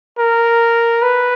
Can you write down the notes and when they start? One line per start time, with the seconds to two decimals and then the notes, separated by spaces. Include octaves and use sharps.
0.18 A#4
1.02 B4